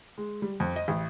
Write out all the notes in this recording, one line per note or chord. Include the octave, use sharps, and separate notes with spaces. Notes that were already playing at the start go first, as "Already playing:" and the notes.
G#3
G3
F2
D#5
A1